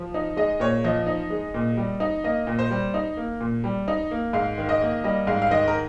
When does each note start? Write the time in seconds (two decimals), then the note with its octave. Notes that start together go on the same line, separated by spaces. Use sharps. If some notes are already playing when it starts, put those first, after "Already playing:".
Already playing: F3
0.14 D#4
0.37 G#3 D#5
0.60 A#2 C#5
0.84 F3 D#5
1.07 D#4
1.30 G#3
1.54 A#2
1.77 G3
2.00 D#4
2.24 A#3 D#5
2.47 A#2
2.59 C5
2.71 G3
2.94 D#4
3.17 A#3
3.41 A#2
3.64 G3
3.88 D#4
4.11 A#3
4.33 G#2 F5
4.58 D#3
4.69 D#5
4.81 A#3
5.04 G3 D#5
5.27 G#2 F5
5.42 F5
5.51 D#3 D#5
5.68 A#4